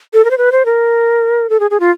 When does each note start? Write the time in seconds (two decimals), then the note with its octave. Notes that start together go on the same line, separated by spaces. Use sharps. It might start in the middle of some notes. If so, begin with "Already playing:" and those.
0.14 A4
0.25 A#4
0.31 C5
0.38 B4
0.52 C5
0.65 A#4
1.50 A4
1.60 G#4
1.71 G#4
1.80 F4